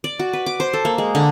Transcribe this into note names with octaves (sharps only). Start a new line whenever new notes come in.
D5
F#4
B4
D6
C5
A4
A#3
G#3
D3